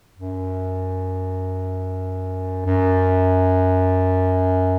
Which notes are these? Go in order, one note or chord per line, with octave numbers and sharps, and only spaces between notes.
F#2
F#2